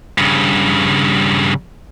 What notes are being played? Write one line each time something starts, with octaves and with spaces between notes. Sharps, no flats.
G2 C#3